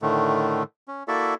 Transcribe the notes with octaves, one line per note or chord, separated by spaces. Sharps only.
A2 D3 D#3 A3
C#4
A#3 E4 F#4 A4 D5 E5